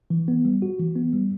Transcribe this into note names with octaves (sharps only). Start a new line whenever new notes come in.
E3
B3
G3
F#4
E3
B3
G3